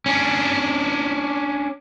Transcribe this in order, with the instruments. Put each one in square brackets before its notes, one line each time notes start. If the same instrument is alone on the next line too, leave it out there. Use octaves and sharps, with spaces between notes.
[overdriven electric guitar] C#4 D4